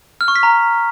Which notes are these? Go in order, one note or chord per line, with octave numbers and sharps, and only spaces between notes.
F6
C#6
B6
A#5